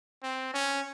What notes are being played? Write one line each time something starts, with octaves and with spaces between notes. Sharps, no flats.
C4
C#4